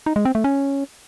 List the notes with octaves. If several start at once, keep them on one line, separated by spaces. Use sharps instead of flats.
D#4
G#3
C4
A3
C#4